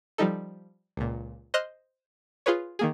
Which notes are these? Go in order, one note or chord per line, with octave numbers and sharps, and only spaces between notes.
F3 G3 D#4 A4
C#2 A#2
C5 D#5 C6 F6 F#6
F4 G#4 B4 C#5
D#3 A#3 G#4